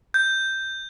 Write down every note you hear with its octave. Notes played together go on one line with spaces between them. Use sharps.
G6